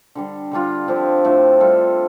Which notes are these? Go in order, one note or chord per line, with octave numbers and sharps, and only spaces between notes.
D3 G3 D4
D3 G3 D4 F4
D3 F3 C4 G4
A2 F3 A3 D4
G3 F4 A4